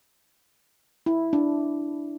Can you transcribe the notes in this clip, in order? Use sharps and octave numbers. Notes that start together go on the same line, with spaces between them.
E4
D4